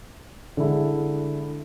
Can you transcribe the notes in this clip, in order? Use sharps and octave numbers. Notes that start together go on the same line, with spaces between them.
D3 G#3 D4 E4